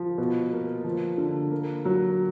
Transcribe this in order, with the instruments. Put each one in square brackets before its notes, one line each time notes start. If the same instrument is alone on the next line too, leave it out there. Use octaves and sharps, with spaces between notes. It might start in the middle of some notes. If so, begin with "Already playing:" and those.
Already playing: [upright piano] F3
B2
A#3
F3
D3
A#3
F#3